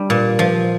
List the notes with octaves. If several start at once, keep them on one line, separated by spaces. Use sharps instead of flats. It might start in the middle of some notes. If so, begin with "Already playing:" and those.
Already playing: G3 D4
A#2
F3